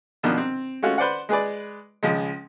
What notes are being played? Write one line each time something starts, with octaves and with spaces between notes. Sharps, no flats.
F#2 B2 D#3 F3 D4
C4
G#3 A3 C#4 F4 F#4
B4 C5 D5 F#5
G#3 G#4 B4 D5
C#2 F3 G#3